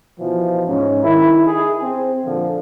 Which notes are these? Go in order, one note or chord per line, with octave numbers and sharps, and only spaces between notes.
B2 E3 F3
G#2 C#4
D#3 E4
G#4
C4
A#2 D3 F3